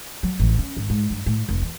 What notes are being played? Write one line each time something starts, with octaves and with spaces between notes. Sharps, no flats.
F#3
A1
C#4
G#1
G#2
G2
A2
F1
E2